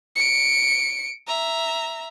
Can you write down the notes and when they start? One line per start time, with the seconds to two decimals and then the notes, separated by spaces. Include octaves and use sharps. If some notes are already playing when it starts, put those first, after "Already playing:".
0.16 C#7 D7
1.27 E5 A#5